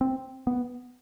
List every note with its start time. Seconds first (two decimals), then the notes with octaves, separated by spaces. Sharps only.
0.01 C4
0.47 B3